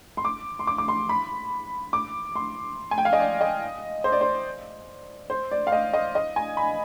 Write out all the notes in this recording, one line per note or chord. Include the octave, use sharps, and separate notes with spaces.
C6
D6
C6
D6
D6
C6
B5
D6
C6
G#5
G5
F5
D#5
D5
D#5
C5
D5
C5
C5
D5
F5
D#5
D#5
D#5
G#5
B5